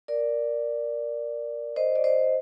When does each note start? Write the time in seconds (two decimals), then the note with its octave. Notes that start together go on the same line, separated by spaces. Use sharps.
0.08 A#4 D5
1.76 C5 D#5
1.96 D5
2.04 C5 D#5